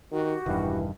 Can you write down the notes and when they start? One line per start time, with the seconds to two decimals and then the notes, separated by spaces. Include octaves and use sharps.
0.12 D#3 F#4 G4
0.46 E1 G2 D#3 E3